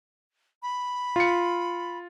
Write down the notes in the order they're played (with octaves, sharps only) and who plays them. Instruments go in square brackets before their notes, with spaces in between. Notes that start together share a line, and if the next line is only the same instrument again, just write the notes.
[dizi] B5
[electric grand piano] F4 C#7